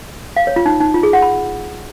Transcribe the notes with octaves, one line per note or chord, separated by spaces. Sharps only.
F5
C#5
F4
D#4
D#4
F4
G#4
F#5
B5